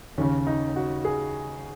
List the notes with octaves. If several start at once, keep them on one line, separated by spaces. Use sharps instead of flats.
D#2 C#3 C#4
D#4
F#4
G#4